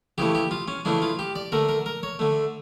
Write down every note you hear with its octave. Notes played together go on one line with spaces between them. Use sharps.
C#3 E3 A3 G4
G4
F4
C#4
C#3 E3 A3 D4
F4
G4
D5
D3 A3 A#4
A#4
A#4
C#5
D3 A3